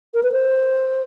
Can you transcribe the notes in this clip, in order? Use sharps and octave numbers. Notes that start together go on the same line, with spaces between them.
A#4
B4
C5